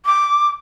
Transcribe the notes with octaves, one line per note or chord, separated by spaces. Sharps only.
D6